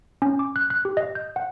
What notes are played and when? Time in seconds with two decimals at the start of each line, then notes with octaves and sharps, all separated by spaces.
0.22 C#4
0.39 D6
0.56 F#6
0.70 F#6
0.85 G4
0.97 D#5
1.15 G6
1.36 F#5